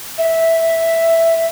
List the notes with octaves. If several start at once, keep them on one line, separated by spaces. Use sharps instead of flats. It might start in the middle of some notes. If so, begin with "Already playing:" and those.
E5